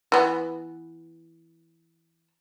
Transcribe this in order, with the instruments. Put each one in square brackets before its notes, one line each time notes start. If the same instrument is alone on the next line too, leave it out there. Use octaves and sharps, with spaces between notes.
[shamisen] E3 B3